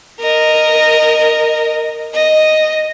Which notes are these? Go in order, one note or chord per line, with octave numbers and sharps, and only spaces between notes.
A#4 D#5
D#5